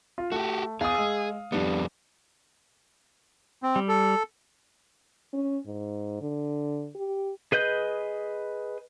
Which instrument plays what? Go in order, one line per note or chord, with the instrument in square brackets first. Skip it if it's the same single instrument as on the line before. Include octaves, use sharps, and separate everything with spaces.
[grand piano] F4
[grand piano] A3 [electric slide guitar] F#4 G4
[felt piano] E2 [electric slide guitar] G#4 [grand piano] F5 D#6
[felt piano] G#3 E6
[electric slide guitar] F2 B3 [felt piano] G3 D4
[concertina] C4
[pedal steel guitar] G3
[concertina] A4
[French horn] C#4
G#2
D3
G4
[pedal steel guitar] G#4 B4 D#5 G6